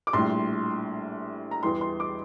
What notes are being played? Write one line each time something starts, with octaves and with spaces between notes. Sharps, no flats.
D6
A#1 A2 G3 C6
A#5
E2 E3 G3 C6
C6
D6